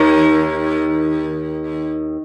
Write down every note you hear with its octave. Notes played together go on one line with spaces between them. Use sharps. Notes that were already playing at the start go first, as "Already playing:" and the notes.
Already playing: D#2 D#3